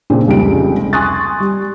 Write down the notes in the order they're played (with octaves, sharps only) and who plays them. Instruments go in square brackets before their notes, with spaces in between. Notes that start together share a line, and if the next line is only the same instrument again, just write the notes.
[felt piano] A#2 C#3 C4 D4
F1 C#2 G3 C4 D7
G#5 C6 C#6 D#6 F#6 A6
G3